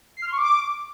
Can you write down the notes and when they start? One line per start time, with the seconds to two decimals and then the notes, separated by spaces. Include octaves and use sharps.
0.17 C7
0.22 F6
0.27 C6
0.32 C#6
0.38 D6